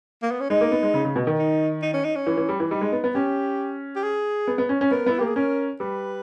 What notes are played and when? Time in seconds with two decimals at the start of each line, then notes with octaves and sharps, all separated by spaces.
0.22 A#3
0.31 B3
0.40 C#4
0.50 G#3 D#4
0.61 A#3
0.72 B3
0.83 G#3
0.94 C#3
1.05 C#3
1.16 B2
1.27 D#3
1.38 D#4
1.82 D#4
1.94 C#4
2.04 D#4
2.16 C#4
2.27 E3
2.37 E3
2.49 G3
2.60 E3
2.70 G3 D#4
2.81 G#3
2.92 B3
3.04 B3
3.14 C#4 G4
3.96 G4
4.03 G#4
4.47 B3
4.58 B3
4.69 C#4
4.81 C#4
4.91 B3 A#4
5.06 B3 E4
5.19 A#3 G4
5.27 G#4
5.36 C#4 A#4
5.80 G3 B4